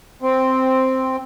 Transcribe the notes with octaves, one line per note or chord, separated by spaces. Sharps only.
C4